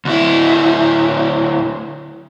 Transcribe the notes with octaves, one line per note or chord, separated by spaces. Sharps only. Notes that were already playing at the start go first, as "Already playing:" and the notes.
D2 E4